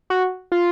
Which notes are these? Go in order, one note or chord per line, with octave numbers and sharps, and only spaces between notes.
F#4
F4